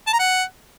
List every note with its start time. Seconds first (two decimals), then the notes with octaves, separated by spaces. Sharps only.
0.07 A5
0.13 A#5
0.19 F#5